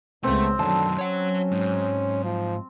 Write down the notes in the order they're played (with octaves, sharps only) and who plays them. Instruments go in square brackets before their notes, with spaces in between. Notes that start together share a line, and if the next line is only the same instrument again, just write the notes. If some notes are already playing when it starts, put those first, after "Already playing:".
[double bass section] C#2 [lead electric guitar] A3 [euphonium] B3 [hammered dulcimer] C4
[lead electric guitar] F#2 D#3 [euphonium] D3 [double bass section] F#3 [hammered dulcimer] A5
[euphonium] C#4 [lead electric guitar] C#5 F#5
[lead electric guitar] G#2
[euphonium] F3